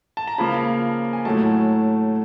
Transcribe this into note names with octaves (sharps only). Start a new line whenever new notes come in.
A5
A#5
C#3 F3 A#3 B5
G#5
A2 F#3 A3 A5